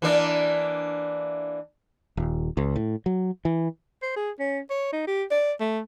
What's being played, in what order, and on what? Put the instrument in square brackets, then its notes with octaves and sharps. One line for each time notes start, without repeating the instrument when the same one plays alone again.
[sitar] E3 A#3 D4
[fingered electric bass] D#1
C#2
A2
F#3
E3
[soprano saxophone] C5
G#4
C#4
C#5
D#4
G4
D5
A3